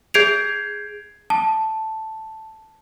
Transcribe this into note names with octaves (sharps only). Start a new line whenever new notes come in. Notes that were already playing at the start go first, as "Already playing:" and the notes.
G#4 G6 G#6 C7 D7 F7
A5